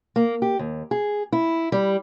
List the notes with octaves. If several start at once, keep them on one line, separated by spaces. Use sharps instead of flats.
A#3
G4
D#2
G#4
E4
G3